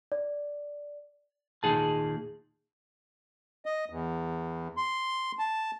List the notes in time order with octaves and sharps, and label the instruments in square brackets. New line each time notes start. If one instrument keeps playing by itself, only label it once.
[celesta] D5
[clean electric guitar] D#2 A#2 A3 D#4 G#4 A5
[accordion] D#5
E2
C6
A5